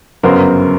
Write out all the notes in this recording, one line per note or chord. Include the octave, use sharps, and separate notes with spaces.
G1 F#2 C#3 F#3 B3 A#4 C5